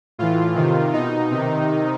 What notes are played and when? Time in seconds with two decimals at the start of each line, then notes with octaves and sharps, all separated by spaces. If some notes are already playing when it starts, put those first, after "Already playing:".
0.19 A2 E3 F4
0.56 C3 D#3
0.93 B2 D#4
1.31 C3 D#3